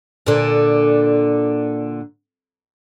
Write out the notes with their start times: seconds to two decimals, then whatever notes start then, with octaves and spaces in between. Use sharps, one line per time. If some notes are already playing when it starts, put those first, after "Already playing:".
0.26 A#2 D3